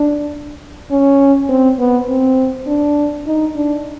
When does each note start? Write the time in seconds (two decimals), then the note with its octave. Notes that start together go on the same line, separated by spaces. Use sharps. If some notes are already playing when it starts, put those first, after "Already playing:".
Already playing: D4
0.91 C#4
1.49 C4
1.79 B3
2.09 C4
2.67 D4
3.27 D#4
3.56 D4